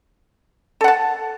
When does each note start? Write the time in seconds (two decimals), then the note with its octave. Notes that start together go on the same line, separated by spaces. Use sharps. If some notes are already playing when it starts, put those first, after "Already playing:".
0.81 A4
0.84 F#5
0.88 A5